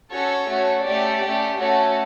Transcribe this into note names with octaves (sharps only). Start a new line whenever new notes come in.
C#4 F#4 A4 C#5
A3 C#4 F#4
A3 C#4 G4 D5
A3 C#4 G4
A3 C#4 F#4 A4 C#5